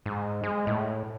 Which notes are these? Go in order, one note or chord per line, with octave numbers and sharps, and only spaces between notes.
G#2
G#3
A2